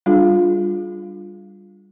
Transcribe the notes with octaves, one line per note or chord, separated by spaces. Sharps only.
G3 D4 F4 G#4